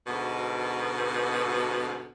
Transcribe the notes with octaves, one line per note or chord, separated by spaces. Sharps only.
D2 G#2 B2